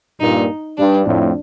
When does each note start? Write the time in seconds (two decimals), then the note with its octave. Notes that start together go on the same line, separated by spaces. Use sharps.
0.21 G2 A#2 D#4
0.78 G2 D4
1.06 F2 A2